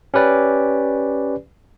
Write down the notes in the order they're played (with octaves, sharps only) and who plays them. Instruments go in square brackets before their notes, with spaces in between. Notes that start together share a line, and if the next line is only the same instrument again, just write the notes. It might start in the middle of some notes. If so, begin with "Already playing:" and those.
[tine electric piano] C#4 G4 B4 D5